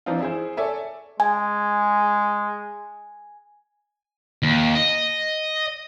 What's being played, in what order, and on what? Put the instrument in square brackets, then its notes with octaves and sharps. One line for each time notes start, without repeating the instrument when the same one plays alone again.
[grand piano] E3 F3 C4 D4 D#4 F4
E4 G#4 C5
A4 C#5 D5 E5 G#5
[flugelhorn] G#3 [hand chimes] G#5
[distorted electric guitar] D#2
D#5